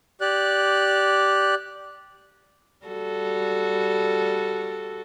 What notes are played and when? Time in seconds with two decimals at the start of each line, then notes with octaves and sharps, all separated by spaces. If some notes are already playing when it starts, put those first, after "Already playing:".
0.21 G4 D5 F#6
2.86 G3 F#4 A4